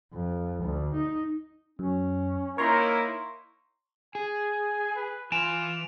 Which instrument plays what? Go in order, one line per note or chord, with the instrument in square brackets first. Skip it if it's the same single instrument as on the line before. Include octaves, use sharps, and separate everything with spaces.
[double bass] F2
D2
D#4
[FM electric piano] F#2 [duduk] C#4
[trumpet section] A#3 D#4 E4 [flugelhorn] A#4 [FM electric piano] C#5 A#5 C6
[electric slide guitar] G#4 [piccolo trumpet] G#5
[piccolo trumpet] B4
[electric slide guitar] E3 G#5 [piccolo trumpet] F4 [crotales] D7 E7 F7